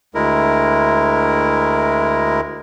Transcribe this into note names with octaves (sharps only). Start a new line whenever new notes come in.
D2 G#3 E4 A#4